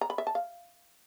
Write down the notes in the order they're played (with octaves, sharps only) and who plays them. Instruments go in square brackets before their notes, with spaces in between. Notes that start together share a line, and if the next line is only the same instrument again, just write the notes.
[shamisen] A#5
B5
E5
A5
F5